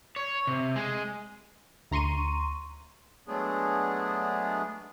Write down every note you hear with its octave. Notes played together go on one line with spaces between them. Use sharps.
C#5
C3
G#3
D2 A#5 C6 C#6 D#7
F#3 G#3 A3 B3 D4 G#4